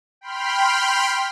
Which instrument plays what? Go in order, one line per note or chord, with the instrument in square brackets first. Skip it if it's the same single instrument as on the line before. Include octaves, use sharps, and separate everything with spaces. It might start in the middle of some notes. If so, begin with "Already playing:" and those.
[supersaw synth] G5 B5 C6 F6